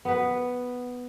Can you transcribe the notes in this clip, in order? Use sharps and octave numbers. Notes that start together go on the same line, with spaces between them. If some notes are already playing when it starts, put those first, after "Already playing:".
B3 B4